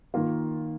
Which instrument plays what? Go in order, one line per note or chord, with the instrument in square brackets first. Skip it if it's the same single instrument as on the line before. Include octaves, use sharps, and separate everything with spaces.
[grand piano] D#3 A#3 F4